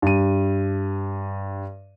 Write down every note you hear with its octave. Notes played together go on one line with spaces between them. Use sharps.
G2 D#7